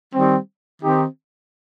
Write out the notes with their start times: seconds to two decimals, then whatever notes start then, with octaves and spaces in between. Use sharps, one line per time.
0.13 D#3 G3 C4
0.81 D#3 C4 D#4 G4